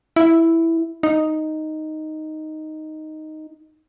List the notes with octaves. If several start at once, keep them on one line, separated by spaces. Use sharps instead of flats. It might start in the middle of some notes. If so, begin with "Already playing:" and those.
E4
D#4